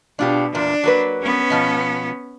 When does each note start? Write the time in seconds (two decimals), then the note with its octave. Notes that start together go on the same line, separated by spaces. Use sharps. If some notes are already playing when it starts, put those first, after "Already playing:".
0.19 B2 D4 F4 G4
0.55 E2 A#2 D4
0.84 F#3 A#3 B4
1.21 B3 C#4
1.50 B2 F3